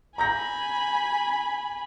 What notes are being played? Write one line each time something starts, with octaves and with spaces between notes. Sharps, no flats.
G#5 A#5 B5 G6 A#6